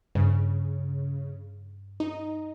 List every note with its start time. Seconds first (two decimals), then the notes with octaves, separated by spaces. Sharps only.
0.15 G2 C#3
2.00 D#4